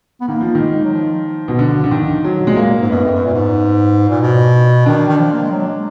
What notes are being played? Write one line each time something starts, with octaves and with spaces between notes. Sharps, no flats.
B3
D#3 A#3
F3
D#3
G#3
F#3
F3
B2
D3
D3
D#3
D3 F#3
B2
A#2 G#3
A#3
A#2
G#2
F#2 B3
F2
F#2
A#2
G#2
A#2
B2
D#3 D4
D#3
F3
A#3
G#3
F#3
G#3